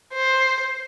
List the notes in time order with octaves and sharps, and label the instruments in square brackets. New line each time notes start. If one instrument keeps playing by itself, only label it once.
[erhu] C5